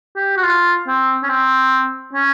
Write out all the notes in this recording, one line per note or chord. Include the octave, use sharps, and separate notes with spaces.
G4
F#4
F4
C4
C#4
C4
C#4